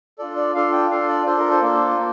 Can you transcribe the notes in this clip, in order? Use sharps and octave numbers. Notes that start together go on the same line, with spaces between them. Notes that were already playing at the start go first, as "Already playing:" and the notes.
D4 F4 A4 D5
D5
D4 F4 A4 F5
G5
D4 F4 A4 F5
D5
D4 F4 A4 C5
A#4
C5
A#3 D4 F4 A4
A#3